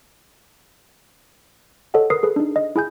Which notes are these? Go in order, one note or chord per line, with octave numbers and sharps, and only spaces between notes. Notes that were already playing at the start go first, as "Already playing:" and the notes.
A4 C#5 D#5 F#5
A#4 B4 D#6 C7
G#4 A4 B4
D4 D#4
D#5
E4 G#4 G#5 G6